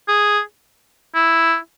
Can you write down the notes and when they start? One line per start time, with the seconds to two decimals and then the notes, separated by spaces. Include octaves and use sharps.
0.08 G#4
1.15 E4